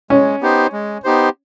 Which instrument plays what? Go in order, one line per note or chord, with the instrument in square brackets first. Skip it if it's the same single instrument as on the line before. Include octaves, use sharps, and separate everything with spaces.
[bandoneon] G#3 [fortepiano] C#4
[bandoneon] B3 D#4 G4 C5
G#3
B3 D#4 G4 C5